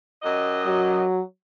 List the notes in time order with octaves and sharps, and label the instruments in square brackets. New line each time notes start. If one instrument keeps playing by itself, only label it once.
[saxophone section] F#2 G4 D#5
[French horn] F#3